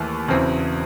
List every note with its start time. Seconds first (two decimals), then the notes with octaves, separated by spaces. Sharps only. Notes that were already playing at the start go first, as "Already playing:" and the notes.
Already playing: D#2 E3 A3
0.28 E1 E2 C#3 E3 C4